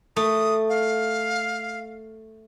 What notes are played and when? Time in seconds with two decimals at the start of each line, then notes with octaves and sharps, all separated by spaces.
0.16 A3 D#6
0.69 F5